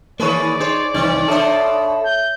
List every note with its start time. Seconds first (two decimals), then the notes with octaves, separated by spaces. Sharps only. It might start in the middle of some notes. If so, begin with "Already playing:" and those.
0.20 D#3 A#3 G#4 B4 C#5 D5
0.60 D#4 G#4 C5 C#5
0.94 C2 D#3 C4 D#4
1.28 B2 D4 A4 C5 C#5 E5
2.05 G6